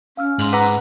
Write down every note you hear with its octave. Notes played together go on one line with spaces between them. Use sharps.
C#4 F5 E6 F6
G#2 C6 F7 F#7
B4 F#5 A#5 D6 E6